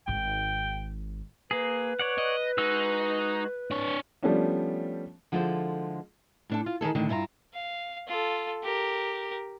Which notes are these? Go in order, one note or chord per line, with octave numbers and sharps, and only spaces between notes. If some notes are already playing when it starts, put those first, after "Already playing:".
G#1 G#2 G5
A#3 G#4 B4
C#5 D5 F#5
D#5
G#3 D#4 F#4 E6
D4 C#5
F3 G3 A3 B3 C#4 D4
D3 F3 G#3 E4 A4 C5
A2 D4 A4
F4
D#3 E3 G#4 A4
A2 D3 D#3
G2 E4 F4 G#5 A#5
F5
F4 A4
G4 A#4